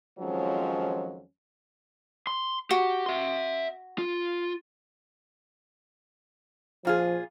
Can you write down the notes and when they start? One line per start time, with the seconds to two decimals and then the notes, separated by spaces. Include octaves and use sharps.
0.19 F2 D#3 F3 F#3 G#3 C#4
2.27 C6
2.71 F#4 G4
3.06 E5 C6
3.98 F4
6.85 A#2 F3 F4 G#4